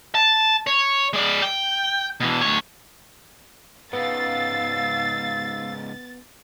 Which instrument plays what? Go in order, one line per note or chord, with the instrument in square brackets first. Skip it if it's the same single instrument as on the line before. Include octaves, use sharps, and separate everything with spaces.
[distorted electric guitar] A5
C#5
G#3 D5
G5
B2 E3
D2 C#5
[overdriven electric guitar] G#2 C#3 [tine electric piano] B3 [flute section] F5 E6 [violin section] A6